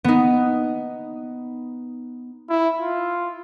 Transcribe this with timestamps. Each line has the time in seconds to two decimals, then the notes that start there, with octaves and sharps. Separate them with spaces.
0.04 B3 D#4
2.50 E4
2.80 F4